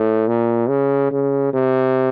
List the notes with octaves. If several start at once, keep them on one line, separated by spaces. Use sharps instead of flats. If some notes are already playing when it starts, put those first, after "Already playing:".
Already playing: A2
A#2
C#3
C#3
C3